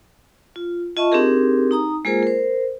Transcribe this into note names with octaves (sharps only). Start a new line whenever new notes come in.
F4
F4 D#5 E5 A5 C#6
C4 D4 D#4 G4 G#4 A#4
D#4 A#5 D#6
G#3 A#3 F4 G#4 A#4 C5
A#4 C5